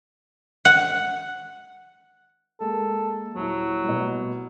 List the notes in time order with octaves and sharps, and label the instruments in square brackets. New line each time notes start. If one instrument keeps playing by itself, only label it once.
[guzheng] F#5
[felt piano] G#3 A#3 [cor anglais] A4
[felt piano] D#1 E4 [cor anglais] F#3
[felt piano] C2 B2